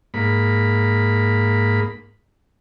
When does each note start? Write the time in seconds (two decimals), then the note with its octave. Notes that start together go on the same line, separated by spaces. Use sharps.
0.14 G#2 A#3 B5